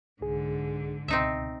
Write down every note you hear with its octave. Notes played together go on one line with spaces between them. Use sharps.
C2 G#2 D3 G#4
C#2 B2 C4 D#4 E5